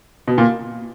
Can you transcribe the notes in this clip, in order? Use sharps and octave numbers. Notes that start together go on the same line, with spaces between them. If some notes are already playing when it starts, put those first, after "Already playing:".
B2
A#2